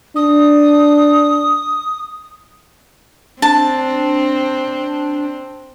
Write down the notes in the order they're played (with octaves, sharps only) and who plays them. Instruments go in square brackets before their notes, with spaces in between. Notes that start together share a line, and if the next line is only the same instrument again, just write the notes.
[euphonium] D4 [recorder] D#6
[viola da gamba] C4 [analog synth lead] D4 [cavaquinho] A5